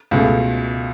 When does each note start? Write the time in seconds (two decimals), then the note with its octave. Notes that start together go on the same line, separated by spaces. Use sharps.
0.11 C#2 B2 A3